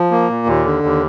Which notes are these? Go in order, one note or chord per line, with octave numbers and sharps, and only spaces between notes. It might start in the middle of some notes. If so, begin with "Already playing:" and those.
Already playing: F3
A#3
A#2
D#2
D3
D#2